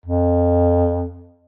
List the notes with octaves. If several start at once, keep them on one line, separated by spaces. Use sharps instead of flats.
F2